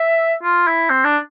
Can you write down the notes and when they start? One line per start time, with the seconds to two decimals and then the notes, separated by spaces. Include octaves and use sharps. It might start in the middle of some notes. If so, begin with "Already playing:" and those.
Already playing: E5
0.43 F4
0.67 E4
0.90 C4
1.04 D4